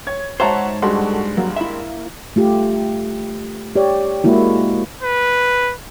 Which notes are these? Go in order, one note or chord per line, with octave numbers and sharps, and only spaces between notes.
C#5 G#6
G#2 F#4 C5 C#5 E5 F#5 A5 A#5
G2 G#3 F#4 A4 C6
F#3 A#3
E4 E5
A3 F4 G4
G4 C#5 D5
G#3 A#3 E4 F#4
B4